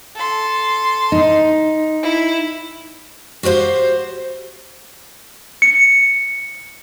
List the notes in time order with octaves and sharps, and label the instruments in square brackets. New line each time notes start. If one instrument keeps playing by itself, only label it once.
[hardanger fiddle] A4 C6
[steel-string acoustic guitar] D#4
[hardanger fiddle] E4
[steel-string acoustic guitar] F#4 G4 A#4 C5 F5
[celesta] C#7